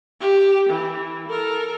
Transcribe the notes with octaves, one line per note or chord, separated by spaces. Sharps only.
G4
E3
A4 A#4